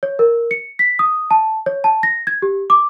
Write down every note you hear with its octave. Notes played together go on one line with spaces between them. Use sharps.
C#5
A#4
C#7
B6
D#6
A5
C#5
A5
A#6
G#6
G4
D6